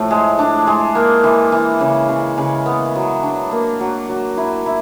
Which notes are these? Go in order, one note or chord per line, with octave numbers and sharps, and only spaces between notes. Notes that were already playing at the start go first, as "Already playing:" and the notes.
Already playing: A2 F3 A3
G#3
D4
G#3
A#3
E3
E3
C#3
C#3
C#3
B3
F#3
D4
A#3
F#3
F#3
E4
E4